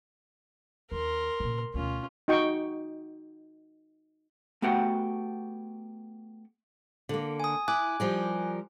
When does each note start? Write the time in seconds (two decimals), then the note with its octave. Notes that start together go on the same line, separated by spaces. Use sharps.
0.92 D#2 A#4 C6
1.40 A#2 C#3
1.74 D2 B2 C#4 F4
2.28 D#4 F#4 D#5 G5 C#6
4.62 A3 B3 F#4 G4 F#5 G5
7.09 D3 A#3
7.40 G#5 D#6
7.68 E4 G#5 D6 F#6
8.00 F3 G3 A#4